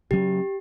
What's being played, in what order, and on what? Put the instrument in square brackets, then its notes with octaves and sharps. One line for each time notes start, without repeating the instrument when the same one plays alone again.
[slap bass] C#3 F#3 C#4 [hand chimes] G4